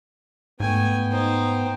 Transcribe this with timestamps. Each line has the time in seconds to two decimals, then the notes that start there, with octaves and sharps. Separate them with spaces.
0.60 G#2 A3 B3 G5 G#5
1.11 D#4 C5